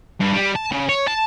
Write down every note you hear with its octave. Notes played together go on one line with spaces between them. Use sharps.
G2
G3
A5
C#3
C#5
A5